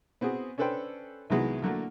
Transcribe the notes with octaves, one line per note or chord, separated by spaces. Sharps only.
B3 C4 F#4 G#4
C#4 D4 A4 B4 C5 G5
C2 D#3 E3 F#3 G#3 B3
D3 F#3 A3 A#3